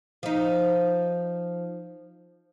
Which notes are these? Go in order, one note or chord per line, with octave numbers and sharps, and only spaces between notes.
F3 D#4